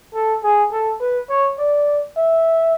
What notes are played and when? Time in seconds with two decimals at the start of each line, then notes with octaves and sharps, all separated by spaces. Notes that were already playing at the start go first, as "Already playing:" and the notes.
0.14 A4
0.43 G#4
0.72 A4
1.00 B4
1.29 C#5
1.58 D5
2.16 E5